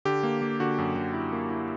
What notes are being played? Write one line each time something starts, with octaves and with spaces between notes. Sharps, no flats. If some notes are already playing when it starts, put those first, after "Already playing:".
D3 G4
A#3
A#3
D3 F#4
F#2
D3
E4
A#3
E4